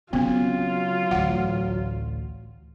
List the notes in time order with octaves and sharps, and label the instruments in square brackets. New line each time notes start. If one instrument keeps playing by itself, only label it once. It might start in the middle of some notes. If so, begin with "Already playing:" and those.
[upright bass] C#3 [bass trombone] F#3 [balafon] B3 C4 [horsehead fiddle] F4
[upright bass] A1 D2 [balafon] F#5